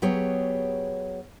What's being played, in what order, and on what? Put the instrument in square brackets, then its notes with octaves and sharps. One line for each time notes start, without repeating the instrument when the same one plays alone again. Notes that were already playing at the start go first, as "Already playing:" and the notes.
[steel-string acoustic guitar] F#3 B3 G4 G#4 C#5